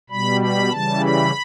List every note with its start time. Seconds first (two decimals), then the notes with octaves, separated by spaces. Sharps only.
0.10 B2 G3 B5
0.41 B5
0.70 C#3 E3 G3 A5
1.02 B5